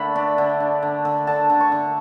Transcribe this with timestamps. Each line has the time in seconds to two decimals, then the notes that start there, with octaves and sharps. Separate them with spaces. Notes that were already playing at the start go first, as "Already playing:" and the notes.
Already playing: D3 A3 B5
0.16 D4
0.38 D3
0.60 D4
0.83 D3
1.05 D3
1.27 D3 A5
1.50 D3
1.60 C#6
1.72 D3